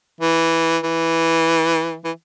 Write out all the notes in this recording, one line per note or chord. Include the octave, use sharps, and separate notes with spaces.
E3
E3
E3